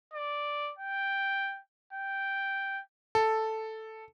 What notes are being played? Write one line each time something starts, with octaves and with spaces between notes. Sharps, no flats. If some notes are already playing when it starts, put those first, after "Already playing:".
D5
G5
G5
A4